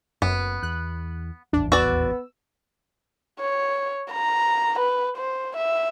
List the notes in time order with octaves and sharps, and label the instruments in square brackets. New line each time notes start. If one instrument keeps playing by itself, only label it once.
[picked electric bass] F#1 [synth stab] F#2 [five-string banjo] B3
[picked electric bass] E2 [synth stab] F#6
[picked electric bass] D#1 A1 E2 [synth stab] D4
[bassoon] B3 [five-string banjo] F#4 D5 [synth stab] E6
[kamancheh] C#5
A#5
B4
C5
E5